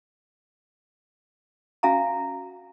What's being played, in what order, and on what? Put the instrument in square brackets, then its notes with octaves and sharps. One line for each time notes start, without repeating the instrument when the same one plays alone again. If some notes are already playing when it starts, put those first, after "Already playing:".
[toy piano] C#4 F#4 E5 F5 G#5 A#5